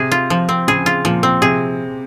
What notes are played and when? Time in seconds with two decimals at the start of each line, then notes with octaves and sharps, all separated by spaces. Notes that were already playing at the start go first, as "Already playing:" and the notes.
Already playing: C3 G#4
0.12 F4
0.30 F3
0.49 C4
0.68 C#3 G#4
0.86 F4
1.05 A#2 F3
1.23 C4
1.42 C3 G#4